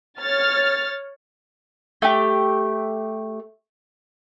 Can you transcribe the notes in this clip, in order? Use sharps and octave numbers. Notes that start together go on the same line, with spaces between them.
C#5 F6 A6
A3 G4